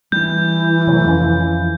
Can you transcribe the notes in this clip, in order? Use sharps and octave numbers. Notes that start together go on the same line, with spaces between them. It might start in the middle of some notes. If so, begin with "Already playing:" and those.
E3 G3 G6
C3 F#3 A3
F2 F3 C#4